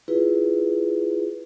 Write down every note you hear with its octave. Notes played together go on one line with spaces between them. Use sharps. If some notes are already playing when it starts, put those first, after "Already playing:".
E4 F4 G#4 B4